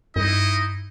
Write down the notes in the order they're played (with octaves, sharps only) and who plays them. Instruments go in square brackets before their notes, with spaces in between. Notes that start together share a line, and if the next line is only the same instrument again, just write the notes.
[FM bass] G2 [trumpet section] D#4 E4 D#5